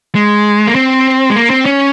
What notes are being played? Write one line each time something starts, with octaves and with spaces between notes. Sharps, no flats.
G#3
A#3
C4
G#3
A#3
C4
C#4